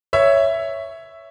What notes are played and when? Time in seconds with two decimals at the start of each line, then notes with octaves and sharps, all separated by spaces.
0.13 C#5 E5